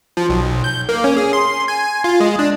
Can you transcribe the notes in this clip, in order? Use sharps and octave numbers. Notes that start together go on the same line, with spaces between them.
F3
B1
G6
A#3
C#4
G#4
C6
G#5
F4
G#3
D4